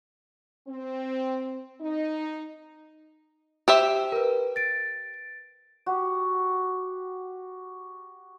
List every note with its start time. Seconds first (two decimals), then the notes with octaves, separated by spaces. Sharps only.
0.68 C4
1.81 D#4
3.68 G4 C5 E5
4.12 A#4 B4
4.56 A6 D7
5.86 F#4 G4